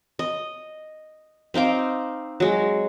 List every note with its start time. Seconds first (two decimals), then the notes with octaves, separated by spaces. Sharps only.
0.19 D#5
1.54 C4 D#4 F5 D6
2.40 F#3 G#3